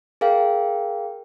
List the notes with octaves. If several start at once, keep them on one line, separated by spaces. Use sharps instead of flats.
G#4 A#4 F5 G5